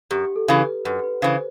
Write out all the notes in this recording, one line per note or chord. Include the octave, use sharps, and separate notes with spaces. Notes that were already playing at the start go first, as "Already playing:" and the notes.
F#2 G4
A4
C#3 E3
B4
F#2 B4
B4
C#3 E3 C5